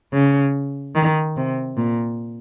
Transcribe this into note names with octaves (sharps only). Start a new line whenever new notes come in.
C#3
D#3
C3
A#2